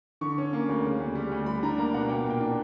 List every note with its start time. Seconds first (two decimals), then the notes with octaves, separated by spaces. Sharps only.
0.21 D3 C#6
0.38 C#4
0.53 A#3
0.69 D2
0.84 C#3
1.00 D2
1.15 G3
1.31 D2
1.46 G3 B5
1.63 D4 A#5
1.78 A#3 A#5
1.94 B2 F#5
2.09 A#3 G5
2.25 A#2
2.30 G5
2.40 D4